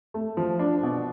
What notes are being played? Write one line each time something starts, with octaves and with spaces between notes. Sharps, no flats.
A3
F3
D4
B2